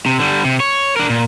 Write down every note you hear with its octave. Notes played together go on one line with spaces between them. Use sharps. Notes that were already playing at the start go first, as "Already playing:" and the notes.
C3
D3 G3
C3
C#5
D4 A#4
A#2